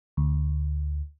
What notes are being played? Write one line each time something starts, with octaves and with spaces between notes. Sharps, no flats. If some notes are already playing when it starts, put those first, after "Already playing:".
D2